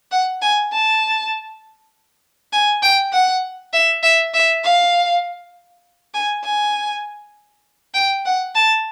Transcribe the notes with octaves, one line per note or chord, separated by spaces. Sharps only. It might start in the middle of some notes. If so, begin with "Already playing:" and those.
F#5
G#5
A5
G#5
G5
F#5
E5
E5
E5
F5
G#5
G#5
G5
F#5
A5